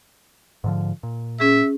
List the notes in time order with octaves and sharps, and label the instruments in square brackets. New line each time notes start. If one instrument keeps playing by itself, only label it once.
[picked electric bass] G#2 D3 F3
A#2
[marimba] C#4 G#4 [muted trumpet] E5